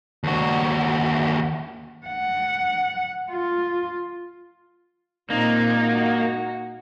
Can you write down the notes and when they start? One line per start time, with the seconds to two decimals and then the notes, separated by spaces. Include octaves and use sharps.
0.24 D#2 F#4
2.07 F#5
3.31 F4
5.30 A#2 G#3 A#3 C4 D#4
5.83 F#4